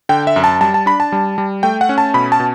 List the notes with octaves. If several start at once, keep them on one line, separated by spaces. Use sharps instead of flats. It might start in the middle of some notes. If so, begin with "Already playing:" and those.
D3 G5
E5
F#2
A5
G3 A5
A5
D4 B5
A5
G3
G3
A3 G5
F#5
C#4
A5
B2 B5
A5
B2